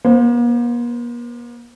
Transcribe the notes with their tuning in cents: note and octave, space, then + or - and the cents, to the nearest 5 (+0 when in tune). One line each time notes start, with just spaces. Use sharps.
A#3 +45 C5 -5